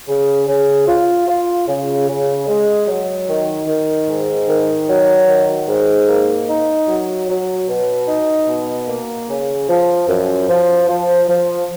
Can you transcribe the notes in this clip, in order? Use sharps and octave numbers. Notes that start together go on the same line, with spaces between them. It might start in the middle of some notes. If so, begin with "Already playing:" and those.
C#3
C#3
F4
F4
C#3
C#3
G#3
F#3
D#3
D#3
G#2
D#3
F#3
D#3
G#2
A#3
D#4
F#3
F#3
B2
D#4
B2
A#3
C#3
F3
F#2
F3
F3
F3